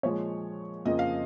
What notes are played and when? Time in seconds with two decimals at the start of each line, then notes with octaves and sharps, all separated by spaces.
0.03 A#2 F3 G#3 C#5
0.85 F2 C#3 F3 A#3 D#5
0.99 F5